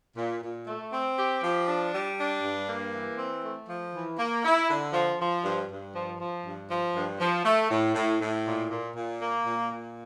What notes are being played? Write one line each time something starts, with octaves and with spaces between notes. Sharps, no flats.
A#2
A#2
A3
C4
G4
F3
D4
G3
D4
G2
A#3
E3
C4
A3
F3
E3
A#3
E4
D3
F3
F3
G2
G2
F3
F3
G2
F3
G2
F3
A3
A2
A2
A2
A#2
A#2
A#2
A#3
A#2
A#2